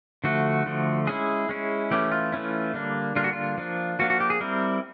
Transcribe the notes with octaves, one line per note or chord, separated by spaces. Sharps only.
D3 F3 A3 F#4
D3 F3 A3
G#3 C#4 E4 G#4
G#3 C#4 E4
E3 A3 C#4 E4 G4
F4
E3 A3 C#4 E4
D3 G3 A#3 D4
D3 G3 A#3 D4 F4
F#4
F4
F3 A#3 D4
F3 A#3 D4 F#4
F#4
G4
G#4
G3 C4 E4 A#4